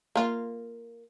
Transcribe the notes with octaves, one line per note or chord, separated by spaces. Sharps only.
A#3 F4